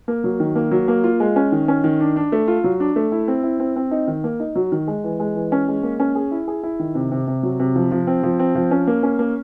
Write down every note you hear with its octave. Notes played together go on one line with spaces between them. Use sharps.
A#3
F#3
D#3
A#3
F#3
A#3
F4
G#3
C#4
D#3
C#4
D#3
D4
D4
A3
F4
F#3
D4
A3
E4
C4
E4
C4
C4
D#4
D#3
A#3
D#4
F#3
D#3
G#3
E3
G#3
E3
C#4
G#3
A#3
C#4
G#4
E4
G#4
E4
D#3
C3
C3
C3
F#3
C3
F3
F3
C4
F3
C4
F3
C#4
A#3
C#4
A#3